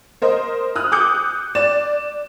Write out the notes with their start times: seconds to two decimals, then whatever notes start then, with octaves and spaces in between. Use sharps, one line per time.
0.22 A#4 C5 D#5
0.76 D#6 F6 F#6
0.92 D6 D#6 F#6 G6 C#7
1.55 D5 E7